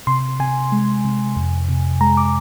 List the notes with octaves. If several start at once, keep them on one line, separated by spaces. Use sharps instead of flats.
C3 C6
C3 G#5
G#3
C3
F2
C3
G#3 A#5
D6